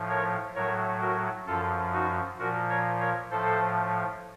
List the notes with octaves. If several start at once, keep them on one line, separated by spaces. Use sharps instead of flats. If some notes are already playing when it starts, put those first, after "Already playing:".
Already playing: A2 F3
A#4 C#5
A2 F#3 A#4 C#5
F#4 A#4
F#2 F3 F4 A4
D#4 F#4
A#2 F3 F#4 A#4
A#4 C#5
A#4 C#5
A2 F3 A4 C5